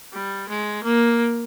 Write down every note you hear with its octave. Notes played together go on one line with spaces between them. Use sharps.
G3
G#3
A#3